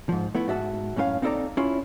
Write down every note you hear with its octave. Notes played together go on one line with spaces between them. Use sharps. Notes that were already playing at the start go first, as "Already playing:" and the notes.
G#2 F3
A3 B3 E4
G#2 F#4 E5 A5
F#2 A2 C#4 A#4 F5
C4 D#4 E4 A4 D5 A#5
C#4 E4 F4